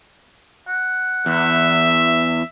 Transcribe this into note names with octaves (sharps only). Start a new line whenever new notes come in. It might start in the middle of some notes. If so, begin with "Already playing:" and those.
F#5
E2 E5